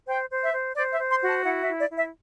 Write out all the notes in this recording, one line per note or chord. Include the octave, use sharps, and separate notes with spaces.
C5 G5
C5
E5
C5
C5 D5
E5
C5
C6
F#4
A5
E4 F#5
E5
E4
D5
E4
E5